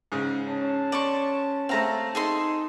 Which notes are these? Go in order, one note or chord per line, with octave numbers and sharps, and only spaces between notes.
G#2 C#3
C#4 A5
D5 C6 C#6
A3 C4 F5 A#5
D#4 G#4 A4 C6